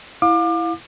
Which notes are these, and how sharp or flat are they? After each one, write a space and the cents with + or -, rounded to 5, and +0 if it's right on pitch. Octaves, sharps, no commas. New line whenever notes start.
E4 +0 F5 +30 D6 +30